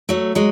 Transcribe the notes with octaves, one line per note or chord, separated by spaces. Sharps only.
F#3 A3
F#3 G#3